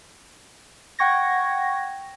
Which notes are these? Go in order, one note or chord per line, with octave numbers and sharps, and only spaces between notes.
F#5 G5 C#6 G#6 A#6